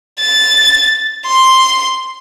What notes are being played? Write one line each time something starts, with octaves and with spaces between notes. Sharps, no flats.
A6
C6